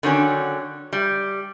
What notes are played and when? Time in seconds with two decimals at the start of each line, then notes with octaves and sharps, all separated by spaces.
0.03 D3 D#3 F#3 C#4
0.93 G3